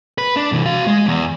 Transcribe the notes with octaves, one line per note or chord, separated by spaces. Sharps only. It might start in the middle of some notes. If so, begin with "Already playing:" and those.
B4
D4
C3 E3
F#4 F5
G#3
E2